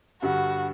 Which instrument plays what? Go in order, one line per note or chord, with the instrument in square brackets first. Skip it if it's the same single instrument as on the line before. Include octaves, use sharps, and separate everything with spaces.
[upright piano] G2 D3 G3 [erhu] F#4